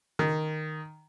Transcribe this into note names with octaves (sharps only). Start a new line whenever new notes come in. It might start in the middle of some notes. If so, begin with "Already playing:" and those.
D#3